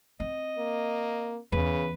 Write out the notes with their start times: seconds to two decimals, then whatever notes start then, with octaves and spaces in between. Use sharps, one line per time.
0.20 C4 D#5
0.58 A#3
1.52 E2 C#3 B4